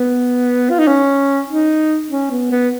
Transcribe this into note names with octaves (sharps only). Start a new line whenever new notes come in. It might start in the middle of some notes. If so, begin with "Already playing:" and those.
Already playing: B3
F4
D#4
C#4
D#4
C#4
B3
B3